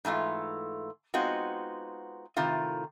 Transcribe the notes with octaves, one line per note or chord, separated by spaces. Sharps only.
G#2 E3 A3 F4
G#3 B3 C4 D#4 F4 F#4
A2 C3 D#3 F4